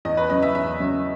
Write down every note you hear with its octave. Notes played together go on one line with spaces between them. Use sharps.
E2 D#5
B4
C#3 F#3 D#5
E5
E2 E5
C#3 F#3